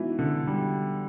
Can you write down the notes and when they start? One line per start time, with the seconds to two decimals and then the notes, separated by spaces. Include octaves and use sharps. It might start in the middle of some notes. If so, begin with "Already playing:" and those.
Already playing: E3 G#3 B3 D#4 F#4
0.19 D3
0.47 G3